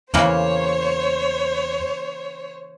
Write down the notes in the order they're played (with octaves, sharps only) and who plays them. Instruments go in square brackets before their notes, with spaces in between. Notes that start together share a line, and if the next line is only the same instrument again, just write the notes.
[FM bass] E2 [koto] C#3 E3 A#3 [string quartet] C5 C#5